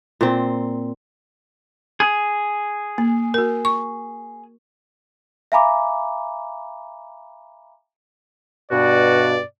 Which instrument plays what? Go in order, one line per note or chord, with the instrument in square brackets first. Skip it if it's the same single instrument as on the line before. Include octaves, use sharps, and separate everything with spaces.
[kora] A#2 C4
[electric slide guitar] G#4
[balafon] A#3
F#4 A#4
C#6
[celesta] E5 F5 G#5 A#5 B5 D6
[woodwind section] G2 B2 [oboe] F#4 [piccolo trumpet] D5